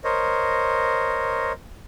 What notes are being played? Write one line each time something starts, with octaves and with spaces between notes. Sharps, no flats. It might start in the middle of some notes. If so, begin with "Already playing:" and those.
A#4 C5 C#5 D#5